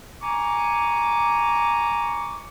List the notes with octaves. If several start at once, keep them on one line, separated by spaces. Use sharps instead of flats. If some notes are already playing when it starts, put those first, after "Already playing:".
G#5 A#5 C#6 D6